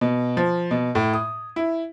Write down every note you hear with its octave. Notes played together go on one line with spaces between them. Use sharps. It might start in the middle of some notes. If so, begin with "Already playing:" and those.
B2
F3
B2
A2
D#6
E4